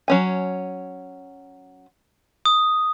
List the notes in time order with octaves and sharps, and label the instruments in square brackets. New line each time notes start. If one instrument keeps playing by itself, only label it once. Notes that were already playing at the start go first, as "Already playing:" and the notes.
[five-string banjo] F#3 C#4 G#5
[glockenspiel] D#6